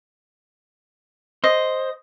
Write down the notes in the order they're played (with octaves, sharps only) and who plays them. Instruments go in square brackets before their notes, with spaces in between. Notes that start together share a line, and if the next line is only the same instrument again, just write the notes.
[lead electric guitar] C5 [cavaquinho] D#5